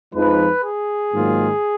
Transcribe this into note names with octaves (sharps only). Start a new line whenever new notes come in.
F2 F3 G#3 D#4 B4
G#4
G#2 D#3 F#3 A#3 F4